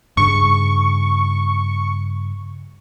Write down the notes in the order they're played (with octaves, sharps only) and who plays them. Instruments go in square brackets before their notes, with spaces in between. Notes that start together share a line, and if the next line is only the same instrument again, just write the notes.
[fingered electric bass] G2 C#3 [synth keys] C#6